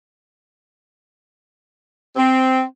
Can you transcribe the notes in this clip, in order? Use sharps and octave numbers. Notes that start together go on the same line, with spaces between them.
C4